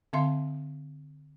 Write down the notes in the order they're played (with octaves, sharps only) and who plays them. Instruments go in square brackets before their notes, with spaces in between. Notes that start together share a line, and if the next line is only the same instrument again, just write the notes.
[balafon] D3 C4 E5 F5 C6